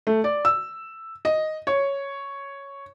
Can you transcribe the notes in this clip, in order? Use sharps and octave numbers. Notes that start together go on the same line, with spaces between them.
A3
D5
E6
D#5
C#5